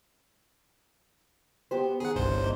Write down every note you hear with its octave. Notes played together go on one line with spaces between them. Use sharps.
B3 G4 C5
D#3 G#4 F#5
G1 C2 C5
C#4
E2 G#2